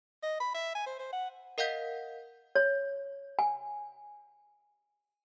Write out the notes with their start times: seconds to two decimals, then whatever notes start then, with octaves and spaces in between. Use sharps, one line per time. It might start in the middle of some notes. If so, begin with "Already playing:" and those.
0.23 D#5
0.40 B5
0.54 E5
0.75 G#5
0.86 C5
0.99 C5
1.12 F#5
1.58 A#4 D#5 F5 F#5 G6 B6
2.55 C#5
3.39 G#5